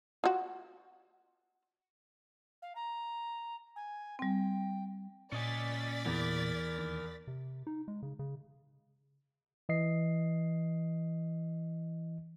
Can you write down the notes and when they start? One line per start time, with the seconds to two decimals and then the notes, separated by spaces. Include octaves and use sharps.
0.24 F4 F#4
2.62 F5
2.75 A#5
3.76 G#5
4.19 G3 C4 G5
5.32 A#2 C#4 D5 D#5 G#5 A6 B6
6.06 E2 A#4
6.78 D#2
7.27 C3
7.67 D#4
7.88 G#3
8.02 C#3
8.19 C#3
9.69 E3 D#5 C7